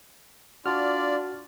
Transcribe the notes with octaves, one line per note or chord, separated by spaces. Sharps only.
D4 F4 F#4 D5 F6